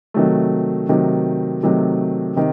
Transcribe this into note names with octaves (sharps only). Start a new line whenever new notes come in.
C3 D#3 F#3 A3
C3 D#3 F#3 A3
C3 D#3 F#3 A3
C3 D#3